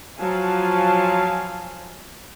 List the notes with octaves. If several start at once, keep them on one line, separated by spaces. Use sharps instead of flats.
F3 F#3 F5 G#5 A5